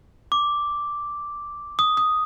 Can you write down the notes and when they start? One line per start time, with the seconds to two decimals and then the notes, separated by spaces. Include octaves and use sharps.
0.32 D6
1.79 D#6
1.97 D#6